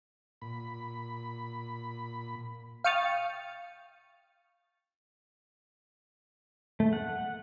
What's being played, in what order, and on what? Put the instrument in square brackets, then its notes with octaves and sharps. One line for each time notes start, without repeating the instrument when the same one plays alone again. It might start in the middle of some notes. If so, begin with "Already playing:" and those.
[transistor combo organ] A#2 B5
[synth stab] F5 G5 C#6 D#6 F6 A6
[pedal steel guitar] A3
F#5